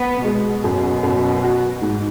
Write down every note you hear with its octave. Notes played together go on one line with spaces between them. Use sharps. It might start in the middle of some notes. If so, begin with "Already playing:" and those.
Already playing: B3
B2 G#3
F#2
F#2
F#4
G#2